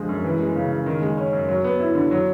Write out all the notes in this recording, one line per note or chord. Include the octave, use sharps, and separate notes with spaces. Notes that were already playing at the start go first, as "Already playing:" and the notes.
Already playing: D3 F3 G#3
F#2
E3
G#3
C#3
C#3
D#3
G#3
C#4
F#2
F#3
B3
E4
D3
F#3